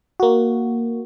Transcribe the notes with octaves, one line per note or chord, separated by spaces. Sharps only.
A#3 F#4